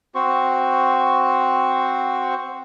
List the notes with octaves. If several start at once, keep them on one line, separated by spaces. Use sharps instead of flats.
C4 F#4 C5 C#6